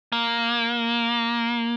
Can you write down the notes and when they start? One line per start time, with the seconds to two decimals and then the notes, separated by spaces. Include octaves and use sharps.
0.12 A#3